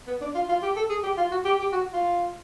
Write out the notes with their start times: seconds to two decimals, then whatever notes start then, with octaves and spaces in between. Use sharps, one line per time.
0.07 B3
0.21 D4
0.35 F4
0.49 F4
0.62 G4
0.76 A4
0.89 G#4
1.03 G4
1.17 F4
1.31 F#4
1.45 G4
1.59 G4
1.72 F#4
1.93 F4